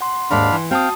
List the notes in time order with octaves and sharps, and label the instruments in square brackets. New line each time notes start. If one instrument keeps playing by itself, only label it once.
[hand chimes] F#5 C6
[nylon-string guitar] D#2 G#2 G#3 [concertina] D4 F5 B5
[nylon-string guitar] E3
[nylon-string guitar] C4 [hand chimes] F#4 A5 D#6 [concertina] F5 G5